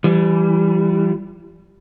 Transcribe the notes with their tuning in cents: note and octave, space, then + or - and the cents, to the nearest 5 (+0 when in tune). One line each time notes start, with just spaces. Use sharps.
E3 +25 G3 -5